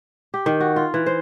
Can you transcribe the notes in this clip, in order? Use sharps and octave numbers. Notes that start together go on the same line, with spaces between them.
G4
D#3
F#4
F4
E3
C5